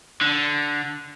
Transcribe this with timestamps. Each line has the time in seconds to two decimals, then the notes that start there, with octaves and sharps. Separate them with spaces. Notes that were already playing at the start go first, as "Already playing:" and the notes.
0.21 D3